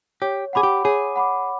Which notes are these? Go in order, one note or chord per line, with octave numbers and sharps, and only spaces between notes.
G4 C#5
G#4 F#5 B5 D6
G4
G#4 C#5
F#5 B5 D6